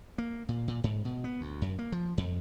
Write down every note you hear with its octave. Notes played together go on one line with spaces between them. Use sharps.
A#3
A#2
A#2
G#2
B2
B3
D2
F#2
A#3
F3
F2